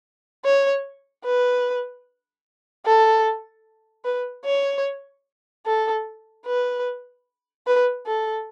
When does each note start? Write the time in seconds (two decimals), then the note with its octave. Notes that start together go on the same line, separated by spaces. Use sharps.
0.45 C#5
1.25 B4
2.86 A4
4.05 B4
4.45 C#5
5.67 A4
6.46 B4
7.67 B4
8.06 A4